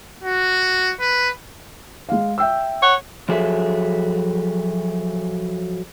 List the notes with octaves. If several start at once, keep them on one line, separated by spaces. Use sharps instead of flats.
F#4
B4
G#3 F5
E5 G5 E6
C#5 F#5
F3 F#3 G#4 A4 E5